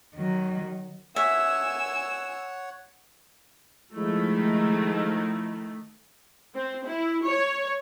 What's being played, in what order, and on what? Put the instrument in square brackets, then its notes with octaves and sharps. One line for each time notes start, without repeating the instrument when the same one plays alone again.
[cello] D#3 F#3
[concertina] C#5 F#5 [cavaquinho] E5 [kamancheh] G#5 E6
[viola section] D#3 A3 [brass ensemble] F3 [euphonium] G#3 [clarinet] E4
[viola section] C4
E4
C#5